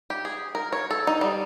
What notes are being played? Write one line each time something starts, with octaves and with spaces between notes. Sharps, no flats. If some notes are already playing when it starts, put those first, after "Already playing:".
G4
G#4
A#4
C#5
A4
D#4
G3